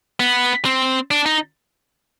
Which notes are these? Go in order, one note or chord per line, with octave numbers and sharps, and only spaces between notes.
B3
C4
D4
D#4